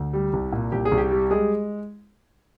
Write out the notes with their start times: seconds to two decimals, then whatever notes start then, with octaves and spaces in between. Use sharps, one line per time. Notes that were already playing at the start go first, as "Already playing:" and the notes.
Already playing: D2
0.13 G3
0.33 C2
0.53 A#2
0.72 C2 G4
0.85 G#4
0.92 C2
0.98 G4
1.11 G3
1.31 G#3 G#4